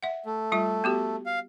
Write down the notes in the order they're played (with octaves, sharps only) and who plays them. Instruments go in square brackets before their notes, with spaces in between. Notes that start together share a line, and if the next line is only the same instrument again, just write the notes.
[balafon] E5 F#5
[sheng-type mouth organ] A3
[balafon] G3 F4 E5
B3 F#4 G4
[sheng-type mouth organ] F5